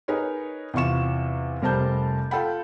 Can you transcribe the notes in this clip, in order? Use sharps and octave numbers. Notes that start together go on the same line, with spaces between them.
D#4 G#4 A#4 B4 C#5
E2 C3 F4 C#6 E7
F1 G3 A#4 C5 A5 G6
F4 A4 G5 B5